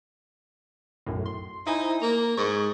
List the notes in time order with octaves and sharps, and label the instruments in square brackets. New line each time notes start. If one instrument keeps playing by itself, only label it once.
[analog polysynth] B1 F#2 A2
C6
[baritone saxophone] D#4 [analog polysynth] E4 C5 G#5
[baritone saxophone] A#3 [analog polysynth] A#5
[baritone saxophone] G#2 [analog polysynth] C#6